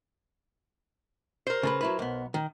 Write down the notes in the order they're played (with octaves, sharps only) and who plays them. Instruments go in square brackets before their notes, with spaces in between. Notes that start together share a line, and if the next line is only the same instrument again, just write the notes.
[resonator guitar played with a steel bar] A#4 C5
[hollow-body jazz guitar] C#3 A4 B4
F#3 E4 B4
B1 B3
D#3